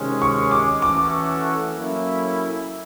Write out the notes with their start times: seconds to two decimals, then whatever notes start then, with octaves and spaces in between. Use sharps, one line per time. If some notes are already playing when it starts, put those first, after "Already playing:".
Already playing: C3 D#3 G#3 C#4
0.22 C#6
0.51 D6
0.82 E3 A3 C#4 F#4 A4 D6
1.74 F#3 A#3 C#4 E4 A4